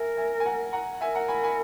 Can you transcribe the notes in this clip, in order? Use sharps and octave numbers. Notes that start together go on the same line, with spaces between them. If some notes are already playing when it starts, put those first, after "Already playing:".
Already playing: A#4 E5 G#5
E5 G#5
G#5
F#5 A#5
F#5 A#5
A#4 E5 G#5
F#5 A#5
G#5 B5
G#5 B5